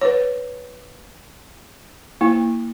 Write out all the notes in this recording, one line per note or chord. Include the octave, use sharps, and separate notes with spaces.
B4 C#5
A#3 E4